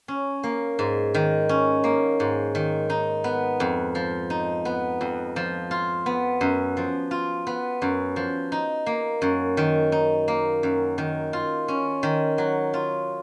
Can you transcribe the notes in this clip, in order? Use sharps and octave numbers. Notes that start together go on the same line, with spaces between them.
C#4
A#3
G#2
D#3
C#4
A#3
G#2
D#3
D#4
B3
F2
F3
D#4
B3
F2
F3
F4
B3
F#2
F3
F4
B3
F#2
F3
D#4
A#3
F#2
D#3
D#4
A#3
F#2
D#3
F4
C#4
D#3
F#3
F4